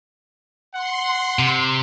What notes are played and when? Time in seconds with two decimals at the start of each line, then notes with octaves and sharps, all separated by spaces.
0.74 F#5 C6
1.39 C3